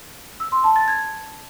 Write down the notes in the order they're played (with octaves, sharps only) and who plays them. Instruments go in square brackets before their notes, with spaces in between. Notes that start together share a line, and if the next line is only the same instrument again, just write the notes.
[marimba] E6
C6
A5
A6
G#6